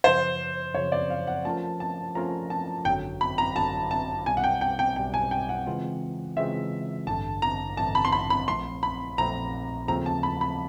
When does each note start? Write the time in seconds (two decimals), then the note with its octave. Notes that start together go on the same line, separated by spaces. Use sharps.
0.04 F#2 C#3 F3 C5
0.75 F#2 C#3 F3 C#5
0.92 D5
1.10 F5
1.27 F#5
1.45 F3 A3 C#4 F4 A#4 A5
1.80 A5
2.15 F3 A3 C#4 F4 A#4 A#5
2.50 A5
2.85 G#1 F#2 D3 F#3 G5
3.21 B5
3.38 A#5
3.55 G#1 F#2 D3 F#3 A5
3.91 A5
4.26 B1 B2 G3 G#5
4.37 F#5
4.44 G5
4.61 G5
4.79 G5
4.96 B1 B2 G3 G5
5.14 G#5
5.31 G5
5.49 F#5
5.67 C#3 E3 G#3 C4 F4
6.37 C#3 E3 G#3 C4 F4 E5
7.07 A1 G2 D3 A5
7.42 A#5
7.77 A1 G2 D3 A5
7.95 B5
8.05 C6
8.12 B5
8.30 B5
8.48 A#1 A#2 F3 A3 C4 C6
8.83 B5
9.18 A#1 A#2 F3 A3 C4 A#5
9.88 D#2 C#3 F3 A3 C4 A#5
10.06 A5
10.23 B5
10.41 B5